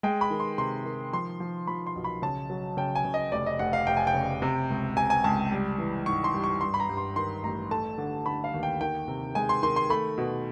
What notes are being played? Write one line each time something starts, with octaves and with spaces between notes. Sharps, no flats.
G#3 G5
B5
D#3
C6
C3 C6
D#3
F3 C6
F3
F3 B5
C6
B1
B5
C#3 A5
F#3
C#3 G5
G#5
C#3
D#5
F1 D5
D#5
F1 F#5
F5
F1 G5
G#5
G5
C#3
C3
C#2
C3 G#5
G#5
C#2 A5
G3
E3
G#2 C#6
C6
G3
C#6
G2 C6
B5
A#5
G2
C6
D#3 C6
A1 A#5
A3 A5
D3
D3 B5
F5
D#2
G5
D#3 G5
C3
G#3 G#5
C6
D#3 C6
C6
A3 B5
B2